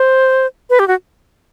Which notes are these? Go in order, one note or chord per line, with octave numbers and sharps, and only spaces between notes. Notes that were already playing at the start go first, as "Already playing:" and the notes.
Already playing: C5
B4
G4
F#4